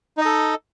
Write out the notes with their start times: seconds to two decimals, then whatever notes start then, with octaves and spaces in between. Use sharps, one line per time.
0.17 D#4
0.21 D#5
0.25 A4